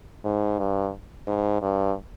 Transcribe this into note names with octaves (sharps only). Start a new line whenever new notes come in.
G#2
G2
G#2
G2